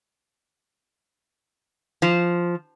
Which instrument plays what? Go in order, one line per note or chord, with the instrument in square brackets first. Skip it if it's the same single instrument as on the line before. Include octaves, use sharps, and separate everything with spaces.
[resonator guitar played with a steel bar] F3